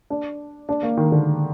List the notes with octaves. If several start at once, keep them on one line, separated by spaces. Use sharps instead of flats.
D4
D4
A#3
D#3
D3